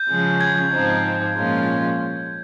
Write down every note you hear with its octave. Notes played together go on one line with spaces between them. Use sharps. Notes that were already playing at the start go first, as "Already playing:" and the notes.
Already playing: G6
C#3 F3 G#3 C#4
G#6
G#2 F3 C4 D#4
A#2 F3 G#3 C#4 F4